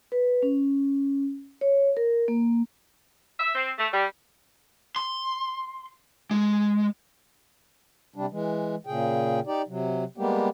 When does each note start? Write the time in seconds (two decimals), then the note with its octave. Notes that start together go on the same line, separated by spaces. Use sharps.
0.12 B4
0.43 C#4
1.61 C#5
1.97 A#4
2.28 A#3
3.40 E5
3.55 C4
3.77 A3
3.92 G3
4.96 C6
6.31 G#3
8.16 C3 G3 D4
8.32 E3 G#3
8.87 A#2 C#3 G#4 G5
9.47 D#4 G4 D5
9.68 C3 F#3
10.17 G3 G#3 A#3 B3 G4